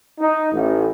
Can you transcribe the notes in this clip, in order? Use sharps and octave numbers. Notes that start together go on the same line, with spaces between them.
D#4
A1